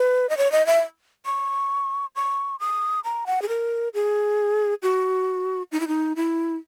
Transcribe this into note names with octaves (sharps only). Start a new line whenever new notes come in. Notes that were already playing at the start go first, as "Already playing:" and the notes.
Already playing: B4
D#5
C#5
D#5
E5
C#6
C#6
D#6
A#5
F#5
G#4
A#4
G#4
F#4
D#4
E4
D#4
E4